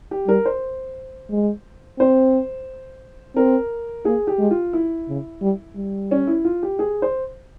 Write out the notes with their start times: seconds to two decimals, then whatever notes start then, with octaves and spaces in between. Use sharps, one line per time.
0.11 G4
0.27 G3 A#4
0.45 C5
1.30 G#3
1.99 C4 C5
3.36 C4 A#4
4.05 A#3 G#4
4.27 G4
4.39 G#3
4.51 F4
4.73 E4
5.08 C#3
5.42 G3
5.76 G3
6.11 C#4
6.27 E4
6.45 F4
6.63 G4
6.79 G#4
7.02 C5